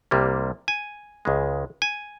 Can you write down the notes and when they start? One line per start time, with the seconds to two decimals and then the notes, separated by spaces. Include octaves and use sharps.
0.11 C2 C3 G3 A#3
0.68 G#5
1.25 C#2 C#3 G#3
1.82 G#5